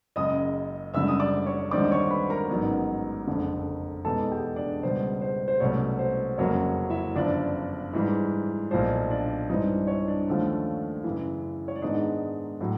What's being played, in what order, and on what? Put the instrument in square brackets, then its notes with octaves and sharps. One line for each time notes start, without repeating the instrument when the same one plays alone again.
[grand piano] F#1 F#2 C#3 D#5 D#6
F#1 F#2 D3 G3 E5 E6
D#6
D5 D6
C#5 C#6
D#2 D3 G3 C4 D#4 D5 D6
C#5 C#6
B4 B5
A#4 A#5
A1 G#2 D#3 F#3 B3
F#1 F2 D3
E2 B2 G#3 B3 D#4 A4 A5
G4 G5
D4 D5
C#2 B2 G3 C5
C5
C5
C2 B2 F#3 A3 C#4 C#5
C5
F#1 F2 C#3 F#3 A#3 C#5
E4 E5
G1 F#2 C#3 F3 D4 D5
G#2 E3 G3
B1 A#2 F3 C5
D4 D5
G2 E3 G3 C4 D#4 D#5
C#5
D4 D5
D#2 D3 F3 A3 C#4
F#2 C#3 E3
C#5
D5
G#2 D#3 G#3 B3 D4 D#4 D#5
A2 F#3